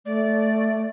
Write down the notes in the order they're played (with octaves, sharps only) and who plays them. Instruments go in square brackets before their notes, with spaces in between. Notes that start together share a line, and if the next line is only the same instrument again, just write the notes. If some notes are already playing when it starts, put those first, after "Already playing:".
[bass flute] A3 [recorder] D5